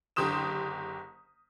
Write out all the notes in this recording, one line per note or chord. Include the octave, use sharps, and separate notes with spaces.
F#1 D3 G4 C6 D#6 E7